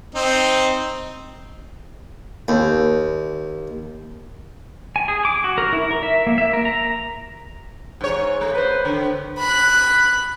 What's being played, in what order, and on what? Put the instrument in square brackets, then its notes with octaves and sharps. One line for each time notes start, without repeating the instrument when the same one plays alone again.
[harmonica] C4 D#4
[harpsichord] D#2
[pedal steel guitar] G#5
G#4
D6
F#4
A#4
E4
A#4
E5
A#3
E5
A#4
A#5
[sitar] G#2 C#5
A3
B4 C5
D3
[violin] B5 F#6